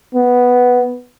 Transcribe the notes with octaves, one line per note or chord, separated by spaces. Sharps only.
B3